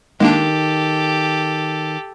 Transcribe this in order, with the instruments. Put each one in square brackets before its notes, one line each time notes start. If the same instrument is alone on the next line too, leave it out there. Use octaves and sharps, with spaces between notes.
[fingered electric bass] D#3 [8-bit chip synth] G#3 A#3 D4 [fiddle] G4 A4